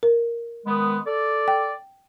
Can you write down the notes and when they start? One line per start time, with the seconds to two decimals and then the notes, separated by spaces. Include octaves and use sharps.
0.03 A#4
0.66 D#3 G#3 B3
1.06 A4 D5
1.48 G5